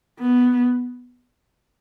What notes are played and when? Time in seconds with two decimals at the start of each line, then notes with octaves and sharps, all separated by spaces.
0.20 B3